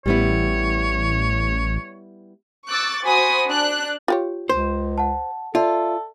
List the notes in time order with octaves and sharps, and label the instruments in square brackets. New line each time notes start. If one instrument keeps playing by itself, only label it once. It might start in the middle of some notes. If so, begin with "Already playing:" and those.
[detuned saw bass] A1 [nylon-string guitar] G3 B3 E4 [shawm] C#5
[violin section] C#6 D6 E6 F#6 A6
F#4 C5 G#5 B5 D#6
D4 F#6
[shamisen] F4 G4 C#5
[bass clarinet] C#2 [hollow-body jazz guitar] C5
[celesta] F#5 A5
[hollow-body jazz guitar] F4 [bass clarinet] A4 [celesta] D5 E5